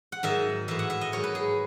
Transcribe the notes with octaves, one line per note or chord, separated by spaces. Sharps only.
F#5
G#2 D#3 F#3 E5
A2 E3 E5
F#5
E5
D#5
G#2 D#3 F#3 C#5
B4
G#4